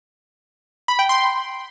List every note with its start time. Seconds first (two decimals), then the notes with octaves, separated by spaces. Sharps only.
0.88 B5
0.99 G5
1.09 C6